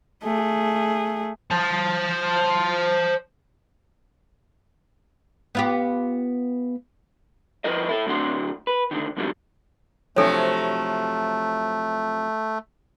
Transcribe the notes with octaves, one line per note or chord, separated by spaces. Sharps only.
A3 G#4
C5 A5
B3 F4 G4
F3 E4 A#4 B4 D#5
E4 A4
D2 A2 F#3 D4 F#5 C6
B4
D2 B2 D3 D#3
F2 G#2 D3 D#3 F#3 G3
C3 F3 F#3 A3 D4 A4 C#5